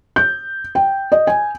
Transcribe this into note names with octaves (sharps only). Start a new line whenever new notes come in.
G6
G5
D#5
G#5